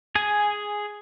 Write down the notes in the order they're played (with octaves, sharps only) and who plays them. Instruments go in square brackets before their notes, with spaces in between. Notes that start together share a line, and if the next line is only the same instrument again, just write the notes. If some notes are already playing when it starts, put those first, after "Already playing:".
[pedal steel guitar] G#4 G#5